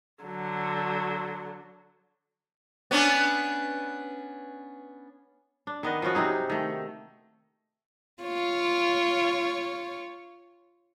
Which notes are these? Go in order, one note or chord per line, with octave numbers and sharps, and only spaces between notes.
D3 F#3
B3 C#4 D4
D4
D#3 B3 D#5 F#5
F3 B3 C#4 F#4
C3 C4 D#4 G#4
D#3 A3
F4 C#5